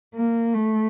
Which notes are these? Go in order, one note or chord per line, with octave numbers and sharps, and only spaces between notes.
A#3
A3